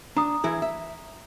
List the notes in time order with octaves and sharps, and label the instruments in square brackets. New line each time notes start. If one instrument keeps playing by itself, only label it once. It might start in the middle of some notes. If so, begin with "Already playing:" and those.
[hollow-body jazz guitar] D4 [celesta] A#5 D#6
[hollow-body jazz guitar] E3 E4 G#4
E5